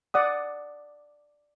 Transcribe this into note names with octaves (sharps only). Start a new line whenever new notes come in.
D5 F#5 D#6